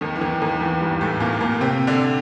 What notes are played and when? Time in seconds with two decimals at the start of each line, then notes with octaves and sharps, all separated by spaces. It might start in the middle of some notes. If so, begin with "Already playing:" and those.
0.01 D#2 D#3
0.16 E3
0.21 D#2 D#3
0.42 D#2 D#3
0.61 E2 E3
0.81 G2 G3
1.01 A2 A3
1.20 A#2 A#3
1.41 A#2 A#3
1.61 C3 C4
1.87 D3 D4